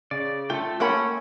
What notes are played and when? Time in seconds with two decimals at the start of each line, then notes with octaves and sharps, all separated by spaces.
0.11 C#3 D5
0.50 A3 F4 A4 G5
0.80 A#3 C#4 F#5 B5